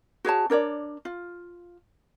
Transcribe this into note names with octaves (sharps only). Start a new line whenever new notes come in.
F#4 G#4 C#5 A5
D4 A#4 C#5 D5
F4